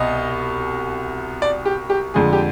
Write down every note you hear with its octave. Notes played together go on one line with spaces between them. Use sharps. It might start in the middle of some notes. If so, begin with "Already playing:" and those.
Already playing: C2 B2 D#5
D5
G4
G4
F2 D3 G#3 G#4
G4